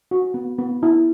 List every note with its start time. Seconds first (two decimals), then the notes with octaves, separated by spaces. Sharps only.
0.11 F#4
0.34 B3
0.59 B3
0.83 E4